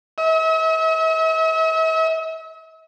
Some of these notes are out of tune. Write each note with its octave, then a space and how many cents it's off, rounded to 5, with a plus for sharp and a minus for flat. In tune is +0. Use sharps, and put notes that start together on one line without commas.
E5 -45